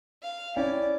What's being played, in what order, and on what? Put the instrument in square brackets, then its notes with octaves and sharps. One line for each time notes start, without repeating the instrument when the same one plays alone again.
[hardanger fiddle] F5
[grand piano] C#4 E4 G5 [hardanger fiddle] D5